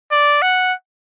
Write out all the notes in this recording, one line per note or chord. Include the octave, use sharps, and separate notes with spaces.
D5
F#5